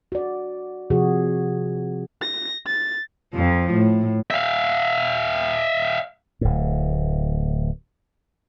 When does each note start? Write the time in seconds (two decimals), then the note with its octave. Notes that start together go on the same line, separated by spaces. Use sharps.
0.12 F#4 D5
0.90 C3 F3 F#4 G#4
2.22 A#6
2.66 A6
3.34 F2 F3
3.73 A2
4.31 E5 F5
6.41 D1 A2